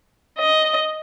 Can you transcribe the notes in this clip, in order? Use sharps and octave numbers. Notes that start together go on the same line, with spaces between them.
D#5